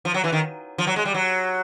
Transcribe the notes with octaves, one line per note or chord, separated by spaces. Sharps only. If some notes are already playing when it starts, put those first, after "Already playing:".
F3
F#3
E3
D#3
F3
F#3
G#3
G3
F#3